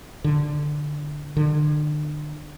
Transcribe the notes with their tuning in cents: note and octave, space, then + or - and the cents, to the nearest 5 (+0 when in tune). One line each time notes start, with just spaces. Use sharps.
D3 +5
D3 +35